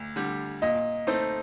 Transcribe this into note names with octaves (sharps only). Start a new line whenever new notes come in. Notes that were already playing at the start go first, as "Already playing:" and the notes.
Already playing: D2
D3 G3
A#2 D#5
A3 C4 D#4